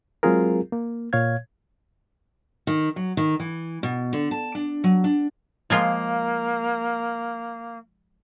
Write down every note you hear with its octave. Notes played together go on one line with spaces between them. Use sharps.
F#3 G#3 C4 F4 G#4 A#4
A#3
A#2 C#5 F5 G#6
D#3
F#3
D#3
E3
B2
D3
A5
D4
F#3
D4
F3 G#3 A#3 F4